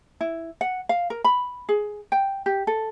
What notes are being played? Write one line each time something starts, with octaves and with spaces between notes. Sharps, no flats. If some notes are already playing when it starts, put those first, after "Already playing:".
E4
F#5
F5
A#4
B5
G#4
G5
G4
A4